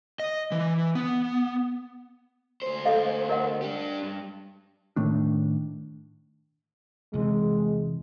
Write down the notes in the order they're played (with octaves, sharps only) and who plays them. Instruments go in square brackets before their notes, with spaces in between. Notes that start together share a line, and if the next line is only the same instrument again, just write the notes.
[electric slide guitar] D#5
E3
B3
[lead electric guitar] D2 C5
[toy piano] A4 D#5 F5
A#4 D#5 F#5
[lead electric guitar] D4 G4
G2
[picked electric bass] A2 D#3 A3 D4
[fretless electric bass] E2 C3 E3 [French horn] G#3